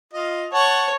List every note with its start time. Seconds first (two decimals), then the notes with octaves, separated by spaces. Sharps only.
0.14 F4 D#5
0.53 C#5 F#5 A5 C#6